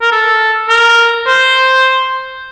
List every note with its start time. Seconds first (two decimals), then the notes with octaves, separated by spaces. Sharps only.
0.02 A#4
0.12 A4
0.69 A#4
1.27 C5